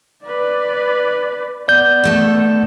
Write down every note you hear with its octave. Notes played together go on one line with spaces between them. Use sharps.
B4 D5
B3 D5 G6
D#3 A3 A4